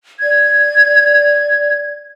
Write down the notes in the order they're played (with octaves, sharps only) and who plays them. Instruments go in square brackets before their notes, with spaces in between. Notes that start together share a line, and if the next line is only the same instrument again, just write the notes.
[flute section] D5 G#6